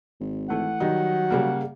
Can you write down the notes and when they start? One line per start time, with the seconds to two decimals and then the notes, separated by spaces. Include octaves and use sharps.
0.20 G#1
0.50 E3 A3 F#5
0.80 D#3 F#3 G3 D#4
1.30 C#3 G3 A#3